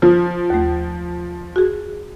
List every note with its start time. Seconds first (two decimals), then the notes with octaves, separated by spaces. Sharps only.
0.02 F3
0.50 D#2 A3
1.56 F#4 G#4